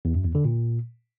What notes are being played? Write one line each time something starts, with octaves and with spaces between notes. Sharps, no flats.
E2
F#2
E2
D3
A#2